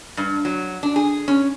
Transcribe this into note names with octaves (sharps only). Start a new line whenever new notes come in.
G2
F#3
D4
G#4
C#4